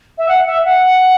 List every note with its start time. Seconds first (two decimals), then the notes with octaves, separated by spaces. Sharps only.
0.18 E5
0.29 F#5
0.46 E5
0.65 F#5